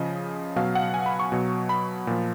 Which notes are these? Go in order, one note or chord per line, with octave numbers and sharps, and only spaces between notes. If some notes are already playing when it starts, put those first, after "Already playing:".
Already playing: C#3 F3 D#5
B2 F#3 F5
F#5
G#5
B5
C#6
B2 F#3
B5
A#2 F3